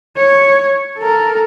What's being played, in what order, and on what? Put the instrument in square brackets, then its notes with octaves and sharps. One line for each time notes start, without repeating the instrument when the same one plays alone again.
[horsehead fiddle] C#5
A4 A#4